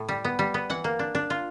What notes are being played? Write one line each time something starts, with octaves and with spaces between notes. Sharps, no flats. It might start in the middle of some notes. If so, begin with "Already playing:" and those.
Already playing: A2
G3
B3
G3
B3
E3 F#5
A#3
D4
D4
F4